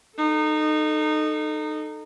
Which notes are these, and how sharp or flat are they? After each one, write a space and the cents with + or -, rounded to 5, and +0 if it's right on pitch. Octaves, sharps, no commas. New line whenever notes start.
D#4 -20 A4 +0